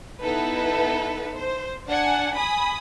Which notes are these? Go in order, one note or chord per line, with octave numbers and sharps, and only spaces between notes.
B3 D#4 E4 A4 B4
C5
D4 F#5 G#5
G#5 B5 D#6